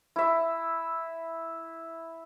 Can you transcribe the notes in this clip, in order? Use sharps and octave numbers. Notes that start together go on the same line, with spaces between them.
E4 E5